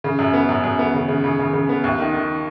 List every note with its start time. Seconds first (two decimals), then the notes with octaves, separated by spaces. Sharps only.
0.04 C#3
0.19 F#2
0.34 B3
0.49 F#2
0.64 F#2
0.79 B3
0.94 C#3
1.08 C#3
1.24 C#3
1.39 C#3
1.53 C#3
1.69 B3
1.84 D#2
1.99 D#3
2.14 D#3